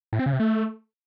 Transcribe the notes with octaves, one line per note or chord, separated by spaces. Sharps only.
A2
C4
C#3
C3
A3